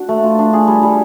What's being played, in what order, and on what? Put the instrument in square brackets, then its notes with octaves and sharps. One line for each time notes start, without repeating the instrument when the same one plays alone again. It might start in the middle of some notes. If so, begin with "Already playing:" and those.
Already playing: [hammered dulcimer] D4 F#4
A3
F4
D4
G#4
G3
G3